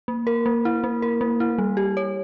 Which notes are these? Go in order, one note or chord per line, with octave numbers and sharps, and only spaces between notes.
A#3
A#4
A#3
E4
A#3
A#4
A#3
E4
G3
G4
C#5